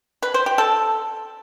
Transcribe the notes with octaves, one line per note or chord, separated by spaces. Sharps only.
B4
C5
G4
A4